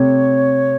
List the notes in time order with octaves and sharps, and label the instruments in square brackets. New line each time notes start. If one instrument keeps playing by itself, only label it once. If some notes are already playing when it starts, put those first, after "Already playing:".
Already playing: [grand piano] C3 A3 [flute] C#5